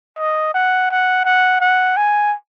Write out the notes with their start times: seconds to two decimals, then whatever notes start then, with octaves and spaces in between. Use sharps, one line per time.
0.18 D#5
0.54 F#5
0.90 F#5
1.25 F#5
1.61 F#5
1.97 G#5